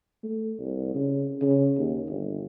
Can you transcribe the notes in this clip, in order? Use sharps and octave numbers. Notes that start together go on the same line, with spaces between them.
A3
C2
C#3
C#3
D#2
G1